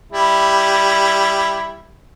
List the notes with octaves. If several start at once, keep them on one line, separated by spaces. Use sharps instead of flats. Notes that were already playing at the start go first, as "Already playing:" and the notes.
G3 E4